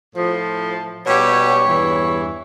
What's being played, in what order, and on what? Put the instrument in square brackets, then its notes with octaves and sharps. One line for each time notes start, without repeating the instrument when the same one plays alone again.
[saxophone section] A2 F3
[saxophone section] B2 G3 G4 [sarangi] C#5
[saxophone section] E2 G2 E3